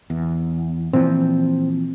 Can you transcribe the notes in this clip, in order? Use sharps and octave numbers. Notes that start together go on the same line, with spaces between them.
E2
A#2 E3 F3 C4